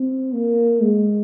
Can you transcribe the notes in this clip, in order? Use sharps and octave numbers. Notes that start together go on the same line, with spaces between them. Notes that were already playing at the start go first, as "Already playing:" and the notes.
Already playing: C4
A#3
G#3